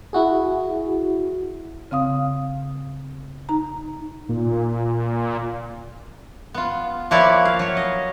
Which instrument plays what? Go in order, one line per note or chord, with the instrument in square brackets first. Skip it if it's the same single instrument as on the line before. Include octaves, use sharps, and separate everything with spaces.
[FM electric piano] E4 F#4 G#4
[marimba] C#3 C4 F5 D#6
D#4 A#5
[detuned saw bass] A#2
[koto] B3 F4
F3 A#3 E4 B4 C#5 D5
F5
F#3 C#5
D#5